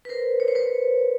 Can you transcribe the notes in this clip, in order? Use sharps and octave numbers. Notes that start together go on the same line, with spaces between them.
B4
A#4 C5
C#5
C5
B4 C#5